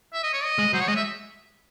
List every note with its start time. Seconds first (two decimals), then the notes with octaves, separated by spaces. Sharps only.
0.13 E5
0.23 D#5
0.33 C#5
0.43 D#5
0.58 G#3
0.73 F#3 C5
0.81 C#5
0.88 G#3 D#5
0.96 E5